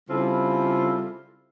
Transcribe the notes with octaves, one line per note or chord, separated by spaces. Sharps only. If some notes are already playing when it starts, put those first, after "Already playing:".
C#3 G3 C4 E4 F4 A4